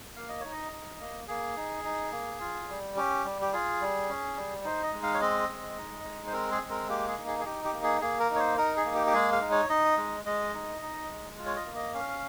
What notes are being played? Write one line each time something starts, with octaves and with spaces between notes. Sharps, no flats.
A#3 F5
D#5
D#4 C#5
D#5
D#4
A#3
A#3 G#4
D#4
D#4
A#3
F4
G3
C#4 G4
G3
G4
F4 G#4
G3
C#4
G3
D#4 C5
D#5
G#3
F5
C#5
C4 D#5
G#3
D#4
G#3
C5
C4 A#4
G#4
G#3
A#4
A#3 G4
G#4
D#4
G#4
G#4
D#4 G4
G4
A#3
G#4
A#3 G#4
A#4
D#4
C#5
C5
D#4 A#4
G#4
A#3
G4
G4
G#3 G#4
F5
D#4
C#5
D#4 D#5
G#3
G#3 D#5
D#4
D#4
G#3
F4
C#5
D#5
A#3
D#5
C#4 F5